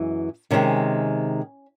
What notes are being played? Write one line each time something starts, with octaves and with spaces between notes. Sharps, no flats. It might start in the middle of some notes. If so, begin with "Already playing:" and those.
Already playing: F#2 E3 G#3
C3 D#3 G#3 C4 C#4